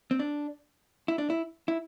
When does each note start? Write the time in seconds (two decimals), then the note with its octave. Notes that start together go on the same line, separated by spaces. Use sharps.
0.11 C4
0.19 D4
1.08 E4
1.18 D4
1.30 E4
1.68 E4